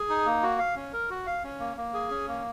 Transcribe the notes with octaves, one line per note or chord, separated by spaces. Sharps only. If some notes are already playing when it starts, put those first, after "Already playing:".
Already playing: G#4
D#4
A#3
F#4
F5
C#4
A#4
F#4
F5
C#4
A#3
A#3
G#4
C#4
A#3